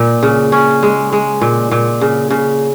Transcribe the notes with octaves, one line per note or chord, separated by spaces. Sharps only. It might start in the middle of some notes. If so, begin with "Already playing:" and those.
Already playing: A#2
C#3
C#4
G#3
G#3
A#2
A#2
C#3
C#3